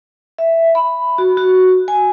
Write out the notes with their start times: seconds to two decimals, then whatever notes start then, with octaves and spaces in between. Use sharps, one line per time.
0.38 E5
0.75 B5
1.18 F#4
1.37 F#4
1.88 G#5